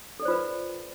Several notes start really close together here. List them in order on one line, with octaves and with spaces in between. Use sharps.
A4 D5 C5 F4 B4